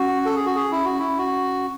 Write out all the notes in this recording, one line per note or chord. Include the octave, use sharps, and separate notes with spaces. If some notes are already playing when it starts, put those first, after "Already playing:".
Already playing: C#4 F#4
A4
G#4
F#4
G#4
E4
F#4
E4
F#4